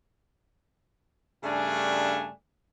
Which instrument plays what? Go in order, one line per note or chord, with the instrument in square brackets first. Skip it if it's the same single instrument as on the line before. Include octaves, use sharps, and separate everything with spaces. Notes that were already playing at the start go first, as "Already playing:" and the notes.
[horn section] G2 C#3 G3 A3 D4 G#5